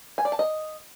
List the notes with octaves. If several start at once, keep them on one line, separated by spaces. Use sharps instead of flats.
G#5
D5
A5
D#5